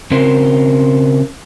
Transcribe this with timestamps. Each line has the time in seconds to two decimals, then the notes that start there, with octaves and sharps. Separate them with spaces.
0.11 C#3 C4 C#4 F#4 A#4 C5